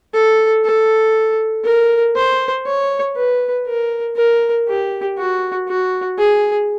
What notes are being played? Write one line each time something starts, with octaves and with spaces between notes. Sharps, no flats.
A4
A4
A#4
C5
C#5
B4
A#4
A#4
G4
F#4
F#4
G#4